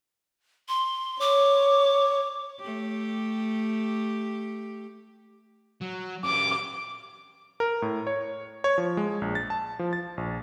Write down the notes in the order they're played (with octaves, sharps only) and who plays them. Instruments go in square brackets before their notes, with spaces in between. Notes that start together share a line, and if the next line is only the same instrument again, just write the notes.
[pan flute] C6
[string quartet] C#5 [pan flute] D6
[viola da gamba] A3 G4
[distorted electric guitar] F#3
[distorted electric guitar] C#4 G4 [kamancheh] D6
[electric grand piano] A#4
A2
C#5
C#5
F3
G#3
A#1
A6
A5
F3
A6
A#1